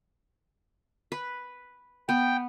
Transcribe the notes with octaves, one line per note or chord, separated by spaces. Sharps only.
B4
B3 G5